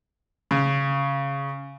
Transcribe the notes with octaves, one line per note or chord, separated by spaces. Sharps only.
C#3